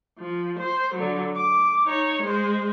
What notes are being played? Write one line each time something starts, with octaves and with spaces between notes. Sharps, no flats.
F3
C5
D3 F#3
D6
D#4 C#5
G#3 C5